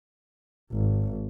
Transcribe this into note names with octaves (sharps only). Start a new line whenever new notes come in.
G#1